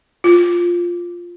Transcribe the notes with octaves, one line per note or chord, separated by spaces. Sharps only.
F4